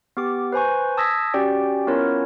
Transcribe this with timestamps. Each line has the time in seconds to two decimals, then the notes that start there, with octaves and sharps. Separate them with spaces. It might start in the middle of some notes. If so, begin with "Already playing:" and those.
0.17 B3 G4 D6
0.52 B4 C5 G#5 C#6
0.97 A5 D#6 E6 G#6 A#6 B6
1.34 C#4 F#4 G4 D5 G5
1.87 B3 C#4 E4 F4 A#4 C#5